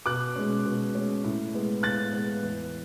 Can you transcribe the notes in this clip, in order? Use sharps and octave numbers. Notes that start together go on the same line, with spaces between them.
B2 D6 F#6
G#3 C#4
B2
G#3 C#4
A2
G#3 B3
A2 F#6 A6
G#3 B3
E2